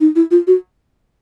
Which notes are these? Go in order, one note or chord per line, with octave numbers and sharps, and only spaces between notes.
D#4
E4
F4
F#4